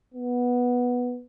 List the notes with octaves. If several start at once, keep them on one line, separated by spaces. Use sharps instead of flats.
B3